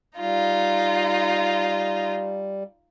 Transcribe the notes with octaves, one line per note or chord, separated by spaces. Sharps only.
G3 D#4 F4